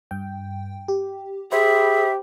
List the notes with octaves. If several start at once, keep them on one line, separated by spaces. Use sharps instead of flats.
G2 G5
G4
G4 G#4 C5 E5 B5